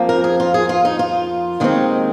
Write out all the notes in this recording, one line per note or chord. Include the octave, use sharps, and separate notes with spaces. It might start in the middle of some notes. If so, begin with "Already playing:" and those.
Already playing: F2 F3 A#3
A#4
G#4
F4
G#4
F4
D#4
F4
D#2 D#3 G#3 C4